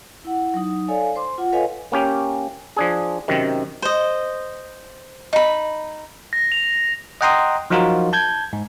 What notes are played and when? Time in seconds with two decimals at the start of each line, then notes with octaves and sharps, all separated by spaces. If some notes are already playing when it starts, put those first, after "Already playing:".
0.24 E4 F#5
0.54 F#3 D#4
0.88 A4 C#5 D5 F5 G#5
1.16 C5 C6 D6
1.38 F4 F#5
1.52 A4 B4 C#5 D#5 F5 G#5
1.92 A#3 C#4 G4
2.77 F3 D4 G#4
3.28 F#2 C3 D#3
3.82 C5 D#5
5.33 D#4 B5
6.33 A#6
6.52 F7
7.21 D#5 F#5 G5 A#5 C6 D#6
7.70 F3 F#3 D#4 F4 F#4 A#4
8.13 A5 G6 G#6
8.53 G#2